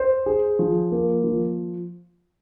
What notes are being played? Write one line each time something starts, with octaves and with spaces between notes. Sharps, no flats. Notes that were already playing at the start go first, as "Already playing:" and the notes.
Already playing: C5
G#4
F3
A#3
F3